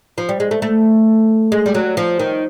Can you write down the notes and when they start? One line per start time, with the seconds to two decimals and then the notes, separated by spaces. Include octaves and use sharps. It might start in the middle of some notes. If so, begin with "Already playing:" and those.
0.18 F3
0.29 G3
0.40 G#3
0.51 A3
0.62 A3
1.52 G#3
1.66 G3
1.74 F#3
1.97 F3
2.19 D#3